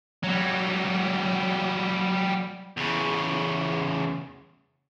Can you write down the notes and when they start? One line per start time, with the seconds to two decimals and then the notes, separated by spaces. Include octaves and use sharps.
0.24 F#3 G3
2.77 E2 C#3